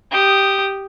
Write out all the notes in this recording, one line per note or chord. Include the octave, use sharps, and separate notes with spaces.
G4 D#6